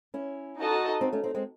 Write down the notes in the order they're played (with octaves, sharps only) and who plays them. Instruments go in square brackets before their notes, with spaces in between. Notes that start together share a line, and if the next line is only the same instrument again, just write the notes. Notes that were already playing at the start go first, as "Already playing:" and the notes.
[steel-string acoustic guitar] C#4 E4
[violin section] D#4 F#4 A4 D#5 A5
[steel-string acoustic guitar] C4 D#4
A3 C#4
C4 D#4
G#3 C4